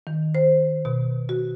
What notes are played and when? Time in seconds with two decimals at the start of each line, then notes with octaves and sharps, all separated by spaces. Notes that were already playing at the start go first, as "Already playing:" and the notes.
0.07 D#3
0.35 C5
0.85 B2
1.29 F#4